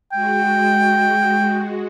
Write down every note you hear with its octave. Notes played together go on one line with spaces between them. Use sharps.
G#3 F#4 G5